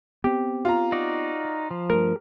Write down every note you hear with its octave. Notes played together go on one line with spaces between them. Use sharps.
B3 C4 G4
F4 A#5
D#4 F#4 D5
F3
G2 A3 A#4